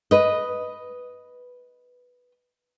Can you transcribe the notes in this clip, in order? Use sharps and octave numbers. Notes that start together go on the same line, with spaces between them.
B4 D#5